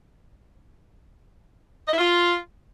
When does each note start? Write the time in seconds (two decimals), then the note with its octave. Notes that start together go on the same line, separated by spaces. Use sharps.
1.88 D#5
1.93 E4
1.98 F4